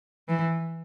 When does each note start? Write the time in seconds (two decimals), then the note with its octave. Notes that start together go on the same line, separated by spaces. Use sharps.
0.28 E3